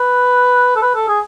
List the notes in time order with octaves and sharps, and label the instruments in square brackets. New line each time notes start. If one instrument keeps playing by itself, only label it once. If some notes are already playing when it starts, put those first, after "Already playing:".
Already playing: [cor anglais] B4
A4
B4
A4
G#4